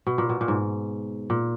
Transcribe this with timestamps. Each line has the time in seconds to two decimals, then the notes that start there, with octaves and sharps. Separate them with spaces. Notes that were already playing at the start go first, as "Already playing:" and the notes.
0.07 B2
0.18 A#2
0.29 B2
0.41 A#2
0.48 G#2
1.30 A#2